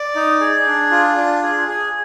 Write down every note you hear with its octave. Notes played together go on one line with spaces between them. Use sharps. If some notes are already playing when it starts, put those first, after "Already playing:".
Already playing: D5
D#4
G#4
D4
F4
D4
G#4
G#4